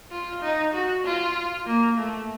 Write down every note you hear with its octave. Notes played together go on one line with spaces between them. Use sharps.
F4
D#4
F#4
F4
A#3
A3